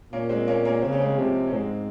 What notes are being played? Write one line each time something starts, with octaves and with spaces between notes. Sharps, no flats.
A#2 A#3 C#4
G#3 C4
A#3 C#4
A#3 C#4
C#3 C4
C#4
G#3 C4
C3 F3 G#3
C#4
G#2 G#3 C4